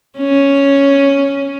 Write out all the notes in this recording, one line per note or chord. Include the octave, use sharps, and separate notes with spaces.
C#4